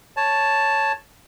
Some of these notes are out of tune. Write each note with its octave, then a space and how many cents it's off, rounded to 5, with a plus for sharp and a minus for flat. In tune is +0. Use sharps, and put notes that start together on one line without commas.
C#5 +0 A5 +0